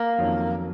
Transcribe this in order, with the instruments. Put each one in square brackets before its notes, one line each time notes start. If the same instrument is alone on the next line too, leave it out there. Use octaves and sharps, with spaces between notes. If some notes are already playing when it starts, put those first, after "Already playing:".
Already playing: [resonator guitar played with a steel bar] A#3
[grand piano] F2 D#3 F#3 C#4